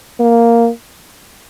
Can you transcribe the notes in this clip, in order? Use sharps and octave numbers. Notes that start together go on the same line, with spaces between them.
A#3